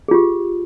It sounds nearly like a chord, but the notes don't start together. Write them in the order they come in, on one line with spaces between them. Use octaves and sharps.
G#4 F4 G4